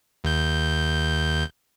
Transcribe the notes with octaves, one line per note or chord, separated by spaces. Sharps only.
D#2 G6